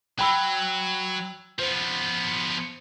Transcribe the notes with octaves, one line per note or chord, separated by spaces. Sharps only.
F#3 G5 B5 E6
F3 B3 C5